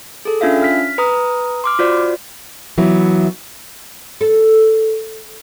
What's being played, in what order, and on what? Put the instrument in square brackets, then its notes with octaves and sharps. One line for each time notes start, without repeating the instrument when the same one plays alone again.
[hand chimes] G#4 A4
C#4 D4 F4 E5 F5
F6 B6
B4 A#5 D#6
C6 D6 F6
F4 F#4 C5 D5
[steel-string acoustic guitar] E3 F#3 B3 E4
[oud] A4